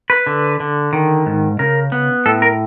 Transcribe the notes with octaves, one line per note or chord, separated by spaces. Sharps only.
B4
D3
D3
D#3
G#2
C#3 A#4
B3
A2 A4
A#4